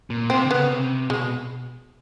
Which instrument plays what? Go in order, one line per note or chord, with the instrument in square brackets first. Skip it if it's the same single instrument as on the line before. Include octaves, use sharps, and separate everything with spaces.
[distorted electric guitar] A#2
[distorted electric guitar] C3 [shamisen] C4
[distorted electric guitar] D3
[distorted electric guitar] C#3 [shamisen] B3
[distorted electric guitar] C3
[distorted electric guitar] B2 [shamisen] G#3